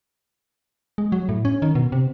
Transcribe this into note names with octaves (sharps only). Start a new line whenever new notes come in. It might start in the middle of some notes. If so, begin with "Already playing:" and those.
G#3
F#3
A2
C#4
D#3
B2
C3